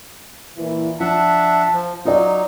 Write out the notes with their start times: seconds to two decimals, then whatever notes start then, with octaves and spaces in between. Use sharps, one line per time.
0.57 A#2 E3
1.00 F3 D4 E5 F#5 A5
1.73 F3
2.05 F#3 D#4 F4 D5